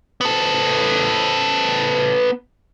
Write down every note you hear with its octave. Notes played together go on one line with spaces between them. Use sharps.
B3 A4